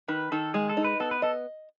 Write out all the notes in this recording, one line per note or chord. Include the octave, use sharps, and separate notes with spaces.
D#3 B4
D#3 A4
G#3 G#4
A4
D#4
B4
B3 A4
B4
A4 D#5